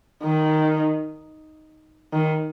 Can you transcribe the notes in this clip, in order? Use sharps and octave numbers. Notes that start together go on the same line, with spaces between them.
D#3
D#3